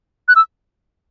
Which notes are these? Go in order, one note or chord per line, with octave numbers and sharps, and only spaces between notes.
F#6
E6